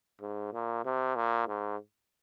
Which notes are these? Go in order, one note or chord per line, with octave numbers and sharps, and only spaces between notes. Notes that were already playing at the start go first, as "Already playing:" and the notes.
G#2
A#2
C3
A#2
G#2